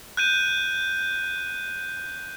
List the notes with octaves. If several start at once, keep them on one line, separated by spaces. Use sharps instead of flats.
F#6 G6 D#7